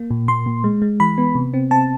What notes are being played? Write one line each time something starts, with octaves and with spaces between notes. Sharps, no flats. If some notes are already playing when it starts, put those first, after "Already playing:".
Already playing: A#3
A#2
A#2 C6
A#2
G#3
G#3
E3 B5
B3
C3
C4
C4 A5